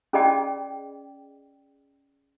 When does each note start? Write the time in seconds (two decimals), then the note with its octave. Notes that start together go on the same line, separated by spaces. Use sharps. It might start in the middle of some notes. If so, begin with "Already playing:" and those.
0.13 C#4 G#4 D5 D#5 G5